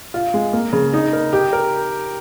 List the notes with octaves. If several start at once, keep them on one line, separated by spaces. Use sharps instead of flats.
F4
G#3
A#3
C#3
D#4
A#4
G4
A#4